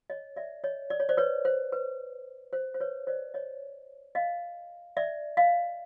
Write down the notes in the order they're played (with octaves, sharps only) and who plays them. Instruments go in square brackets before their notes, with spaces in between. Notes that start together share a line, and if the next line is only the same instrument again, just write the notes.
[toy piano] C#5 D#5
D5 E5
C#5 D#5
D5
C#5
C5 D5
B4 C#5
C5
B4
C5
C5
B4 C#5
C5 D5
C#5 D#5
D#5 F5
D5 E5
D#5 F5